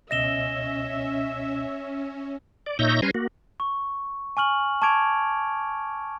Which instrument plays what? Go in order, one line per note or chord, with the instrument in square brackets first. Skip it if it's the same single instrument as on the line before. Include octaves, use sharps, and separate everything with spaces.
[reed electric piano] C#2 B2 D#5 [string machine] C#4 [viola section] E5 [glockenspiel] A#6 E7 G7
[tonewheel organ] D5
A#2 D#4 C#5 E5 G6 A#6
G3 C#4 B4 G#5 A#5 C6
A#3 F#4
[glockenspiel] C#6
G#5 C#6 F6 F#7
A5 C#6 D6 G#6 D7 F7